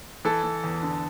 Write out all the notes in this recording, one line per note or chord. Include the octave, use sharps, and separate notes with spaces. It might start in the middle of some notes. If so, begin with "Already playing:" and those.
E3 A4
E3
E2
D3